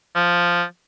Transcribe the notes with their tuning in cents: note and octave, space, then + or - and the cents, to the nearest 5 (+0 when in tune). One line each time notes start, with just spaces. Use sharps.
F3 +0